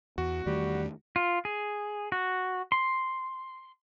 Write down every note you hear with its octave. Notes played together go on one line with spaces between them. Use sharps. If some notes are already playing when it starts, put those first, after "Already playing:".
E2 F#4
E2 D#3 G3 A3
F4
G#4
F#4
C6